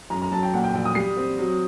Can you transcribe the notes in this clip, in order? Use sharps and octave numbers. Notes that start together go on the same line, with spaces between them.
F#2 A#5
A#5
F#3 A5
G5
A#2 F#5
G5
A#1 G5
D#6
G3 C7
C4
F#3